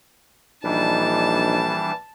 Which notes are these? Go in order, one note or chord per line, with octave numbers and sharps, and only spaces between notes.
A#1 E3 G3 D4 D#4 A5